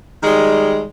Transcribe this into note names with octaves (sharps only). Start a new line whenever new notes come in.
D#3 G3 G#3